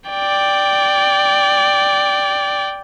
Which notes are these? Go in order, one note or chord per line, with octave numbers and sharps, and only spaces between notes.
D5 G5